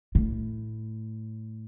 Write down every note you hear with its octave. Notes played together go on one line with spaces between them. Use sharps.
A2